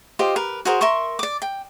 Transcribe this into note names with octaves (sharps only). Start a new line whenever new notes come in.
F4 G4 C5 D#5
A#4 B4
F#4 G#4 A#4 C5
A#4 E5 C6 C#6
D5 D6
G5